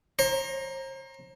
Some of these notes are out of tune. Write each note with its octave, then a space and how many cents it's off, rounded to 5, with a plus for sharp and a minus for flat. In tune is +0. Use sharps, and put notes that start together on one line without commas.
C5 +40 A#5 +0